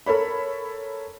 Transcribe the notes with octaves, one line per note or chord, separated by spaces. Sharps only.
A4 A#4 C#5 B5